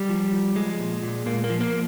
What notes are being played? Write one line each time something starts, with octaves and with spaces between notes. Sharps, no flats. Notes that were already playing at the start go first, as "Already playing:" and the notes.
Already playing: G3
F3
F3
F3 G#3
A#2
A#2
A#2 A#3
A#3
F3
A#3